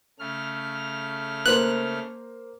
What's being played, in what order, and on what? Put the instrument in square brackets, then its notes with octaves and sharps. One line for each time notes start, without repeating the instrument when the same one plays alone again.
[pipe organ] C#3 A3 F6
[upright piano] A#3 C5 [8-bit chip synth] F#6